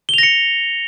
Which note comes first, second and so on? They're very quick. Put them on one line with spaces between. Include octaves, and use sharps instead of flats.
G7 F7 A#6 C#7